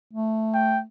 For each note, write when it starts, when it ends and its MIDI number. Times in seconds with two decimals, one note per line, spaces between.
0.13 0.84 57
0.54 0.79 79